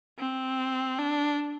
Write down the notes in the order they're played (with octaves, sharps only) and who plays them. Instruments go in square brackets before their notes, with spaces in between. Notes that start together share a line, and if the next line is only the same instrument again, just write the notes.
[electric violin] C4
D4